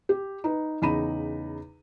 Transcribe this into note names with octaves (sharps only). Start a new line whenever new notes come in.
G4
D#4 B4
E2 C#3 D#4 A#5 B5 D#7